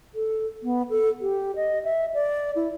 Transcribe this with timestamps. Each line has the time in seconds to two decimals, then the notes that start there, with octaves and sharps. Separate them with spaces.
0.15 A4
0.63 B3
0.90 A4
1.21 G4
1.56 D#5
1.84 E5
2.14 D5
2.56 E4